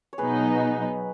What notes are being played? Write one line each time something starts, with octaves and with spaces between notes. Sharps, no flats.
C#5
B2 F#3 B3 D#4 G#4 B4